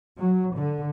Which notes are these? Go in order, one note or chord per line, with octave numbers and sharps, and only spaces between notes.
F#3
D3